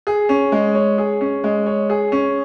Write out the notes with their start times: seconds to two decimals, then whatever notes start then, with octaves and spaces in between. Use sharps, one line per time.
0.07 G#4
0.29 C#4
0.52 G#3
0.75 C#5
0.98 G#4
1.21 C#4
1.44 G#3
1.66 C#5
1.90 G#4
2.12 C#4